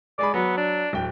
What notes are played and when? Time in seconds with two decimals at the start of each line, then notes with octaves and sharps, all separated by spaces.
0.19 G#3 G#4 D5 B5
0.34 F#3 B3
0.57 D4
0.93 D1 G5